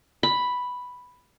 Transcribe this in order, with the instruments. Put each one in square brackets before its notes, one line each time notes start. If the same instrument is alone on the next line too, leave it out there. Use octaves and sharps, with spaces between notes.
[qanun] B5